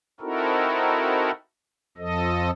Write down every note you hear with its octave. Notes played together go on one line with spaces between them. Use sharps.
C4 D#4 E4 F#4 A4 A#4
F2 F3 A4 D#5